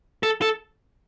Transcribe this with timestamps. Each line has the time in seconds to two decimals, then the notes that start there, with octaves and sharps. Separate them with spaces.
0.23 A4
0.42 A4